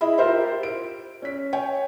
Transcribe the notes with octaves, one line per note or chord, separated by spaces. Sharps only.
E4 G#4 D#5 E5 B5
F4 G4 A#4 C5 E5
D7
C#4 B6
C#5 G5 G#5